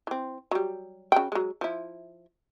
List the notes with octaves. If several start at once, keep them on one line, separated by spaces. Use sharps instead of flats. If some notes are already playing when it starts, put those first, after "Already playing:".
E3 C4
F#3 G3
C#3 F#4 G5
F#3 G#3
F3 E4